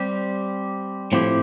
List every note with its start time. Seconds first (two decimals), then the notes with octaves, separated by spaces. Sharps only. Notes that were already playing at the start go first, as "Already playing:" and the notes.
Already playing: G3 C4 G4
1.12 A2 F3 C4 E4 G4